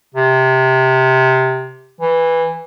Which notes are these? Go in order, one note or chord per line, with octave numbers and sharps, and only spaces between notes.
C3
E3